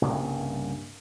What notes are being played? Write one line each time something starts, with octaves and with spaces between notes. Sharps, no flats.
C2 G2 C#3 A#3